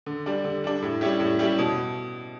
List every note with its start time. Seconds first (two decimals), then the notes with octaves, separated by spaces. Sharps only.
0.06 D3
0.26 G3 D4
0.44 D3
0.64 G3 D4
0.82 A2
1.01 G3 C#4 E4 G4
1.20 A2
1.39 G3 C#4 E4 G4
1.58 B2